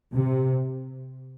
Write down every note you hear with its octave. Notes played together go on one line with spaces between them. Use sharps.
C3